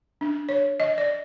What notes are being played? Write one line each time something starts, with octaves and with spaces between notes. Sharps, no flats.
D4
C#5
D#5
D5